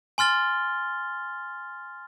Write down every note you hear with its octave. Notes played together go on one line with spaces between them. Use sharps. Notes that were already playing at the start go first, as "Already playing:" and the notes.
G#5 C6 F6 A6 G7